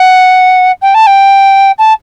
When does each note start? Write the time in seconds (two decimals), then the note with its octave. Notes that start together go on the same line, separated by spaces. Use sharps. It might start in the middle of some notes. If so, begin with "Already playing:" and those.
Already playing: F#5
0.82 G5
0.94 A5
1.07 G5
1.78 A5